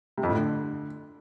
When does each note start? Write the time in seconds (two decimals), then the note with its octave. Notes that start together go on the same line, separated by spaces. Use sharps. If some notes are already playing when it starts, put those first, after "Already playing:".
0.18 C3
0.23 F2
0.29 A2
0.35 D3